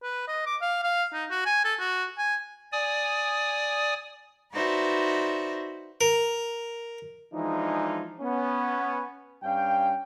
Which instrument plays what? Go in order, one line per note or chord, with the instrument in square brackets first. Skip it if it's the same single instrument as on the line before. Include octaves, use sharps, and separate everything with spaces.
[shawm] B4
D#5
D6
F5
F5
D#4
F#4
G#5
A4
F#4
G#5
[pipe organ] D5 G#5 D#6
[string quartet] D#4 F#4 B4 C5 D5 E5
[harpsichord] A#4
[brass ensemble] E3 F3 G#3 D4 D#4
B3 C#4
G2 C#4 F5 G5